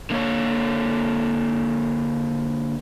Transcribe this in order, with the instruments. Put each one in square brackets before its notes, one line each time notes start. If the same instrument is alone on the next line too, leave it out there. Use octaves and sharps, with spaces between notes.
[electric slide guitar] D3 A#3 C#5